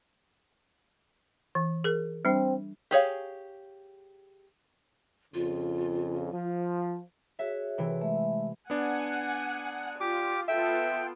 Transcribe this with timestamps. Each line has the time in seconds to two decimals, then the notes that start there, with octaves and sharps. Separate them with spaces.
1.55 E3
1.84 G#4 A#4
2.25 G3 C4 D4
2.91 G4 G#4 C#5 F5
5.34 F2 C#3 F4
6.34 F3
7.39 F#4 G#4 C#5 E5
7.78 C3 E3
8.01 G#3 A3 E5
8.70 B3 D4 F#5 G#5
10.00 F4 G4 D6
10.48 B3 F4 A4 E5 G5